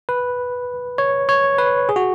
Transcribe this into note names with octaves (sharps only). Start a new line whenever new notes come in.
B4
C#5
C#5
B4
G#4
F#4